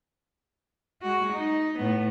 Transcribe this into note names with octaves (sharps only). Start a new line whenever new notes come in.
G#3 F#4
D#4
A2 B3